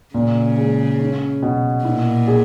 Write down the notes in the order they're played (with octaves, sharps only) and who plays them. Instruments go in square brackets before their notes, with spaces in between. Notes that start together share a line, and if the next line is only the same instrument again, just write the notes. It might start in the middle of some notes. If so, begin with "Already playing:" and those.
[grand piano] A#2 [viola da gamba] C#3
[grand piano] G#3
C#4
B2
[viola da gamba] A#2 [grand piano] E4
[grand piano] G#4